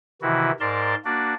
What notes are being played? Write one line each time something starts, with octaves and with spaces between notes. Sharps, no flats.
C3 D#3 E3 E4 F#4
G#2 A#4 D5 A5 C6
A#3 D4 F#4 D5